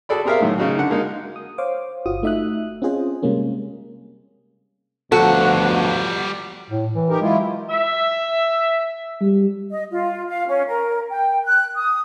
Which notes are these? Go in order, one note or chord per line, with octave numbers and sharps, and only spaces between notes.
F#4 G#4 A4 D5 B5
C4 G4 G#4 A#4 E5 F5
A2 D#3 F#3
C#3 D#4 F#4
D3 F#5
G#3 A#3 D#4
D#6
C5 C#5 F5 D6
G1 F4 F#4 D#6
A3 D#4 E5 D#6 F#6
C4 C#4 F4 G#4 C5 D#5
C3 G3 G#3 A#3 C#4
D2 B2 F3 G3 F#4 A4 F#5
A2
E3
D#4 G4 A#4
F#3 G#3 E4 F4
E5
G3
D#5
F4
F5
C#4
A#4
G5
F#6
D#6